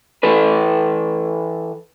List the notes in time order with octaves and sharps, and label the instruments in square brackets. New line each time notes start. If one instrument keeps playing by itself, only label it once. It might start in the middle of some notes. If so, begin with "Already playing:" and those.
[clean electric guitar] E3 A4 B4